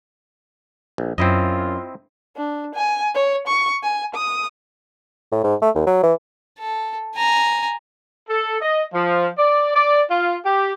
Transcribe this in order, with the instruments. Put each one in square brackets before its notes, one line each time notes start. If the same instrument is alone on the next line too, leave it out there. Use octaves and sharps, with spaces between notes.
[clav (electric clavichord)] A#1
[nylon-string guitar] F#2 [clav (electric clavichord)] C4 E4 D#5 [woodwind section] F4
[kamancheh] D4
G#5
C#5
C#6
G#5
D#6
[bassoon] A2
G#2
A3
D#2
F#3
E3
[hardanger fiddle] A4
G#5 A#5
[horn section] A4
D#5
F3
D5
D5
F4
G4